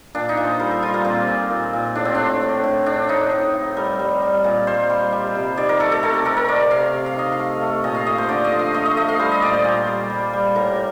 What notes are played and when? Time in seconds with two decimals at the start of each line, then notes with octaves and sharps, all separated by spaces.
0.15 A#2 D4
0.29 D#4
0.37 A#2
0.45 C5
0.59 G3 A#4
0.71 A4
0.82 G3 F4
0.94 A#3
1.05 A#2 C4
1.27 A#2
1.50 A#2
1.73 A#2
1.95 A2 D4
2.05 C4
2.15 A3 D4
2.41 A2
2.64 A2
2.86 A2 D4
3.09 A2 D#4
3.31 A2
3.54 A2
3.77 G3 A#4
3.99 G3
4.22 G3
4.44 A#2
4.67 G3 C5
4.90 G3
5.12 G3
5.35 C3
5.57 D#3 D5
5.69 A#4
5.80 A3 A4
5.92 A4
6.03 C3 A#4
6.14 A4
6.25 C3 A#4
6.37 A#4
6.48 A3 D5
6.71 C3 F5
6.93 C3
7.06 F5
7.16 D#3 D#5
7.32 F5
7.39 A3
7.61 A3
7.84 A#2 D#5
7.95 F5
8.06 A3 D#5
8.18 C5
8.29 D3 D5
8.45 D#5
8.52 F3
8.59 F5
8.74 A3 D#5
8.85 D#5
8.97 A3 D#5
9.08 F5
9.19 G3 C5
9.31 D#5
9.42 A#2 D5
9.53 C5
9.64 A#2
9.88 G3
10.10 G3
10.33 G3
10.56 A2 A#4